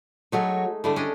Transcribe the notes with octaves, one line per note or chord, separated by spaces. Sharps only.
F#3 G#3 A3 D#4 F#4 C#5
D3 G3 A3 E4
C#4 D4 D#5